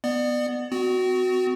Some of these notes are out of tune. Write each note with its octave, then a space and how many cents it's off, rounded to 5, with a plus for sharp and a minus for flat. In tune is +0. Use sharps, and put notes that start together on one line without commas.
B3 +0 D5 +30
C4 -40 F#4 +0